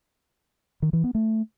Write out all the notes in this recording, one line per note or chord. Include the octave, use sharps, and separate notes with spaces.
D#3
E3
B3
A3